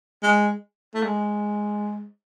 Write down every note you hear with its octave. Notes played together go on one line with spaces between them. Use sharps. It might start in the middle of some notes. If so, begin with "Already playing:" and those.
G#3
A3
G#3